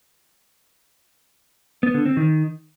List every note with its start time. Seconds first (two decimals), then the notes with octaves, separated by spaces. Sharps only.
1.83 B3
1.94 D3
2.06 C4
2.17 D#3